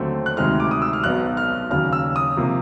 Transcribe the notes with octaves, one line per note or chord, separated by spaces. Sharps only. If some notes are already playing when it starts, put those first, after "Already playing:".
Already playing: D#2 D3 F#3 A3 C4
F#6
D2 C3 D#3 G#3 F6
D6
D#6
E6
F6
B1 B2 F#3 B3 F#6
F6
D#2 C#3 F#3 F6
E6
D#6
C3 F3 A#3